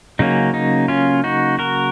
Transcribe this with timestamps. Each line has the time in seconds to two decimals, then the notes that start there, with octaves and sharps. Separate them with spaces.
0.19 C#3 F#3 A#3 C#4 D#4
0.54 D#4
0.88 C#4 F4
1.24 D#4 F#4
1.59 F#4 A#4